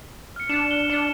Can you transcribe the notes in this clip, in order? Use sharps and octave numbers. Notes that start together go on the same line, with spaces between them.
F6 C#7
D4 E7
G7
D4